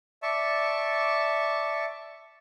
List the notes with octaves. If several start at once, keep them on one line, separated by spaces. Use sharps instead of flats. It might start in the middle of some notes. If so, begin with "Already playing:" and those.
D5 E5 A5 C#6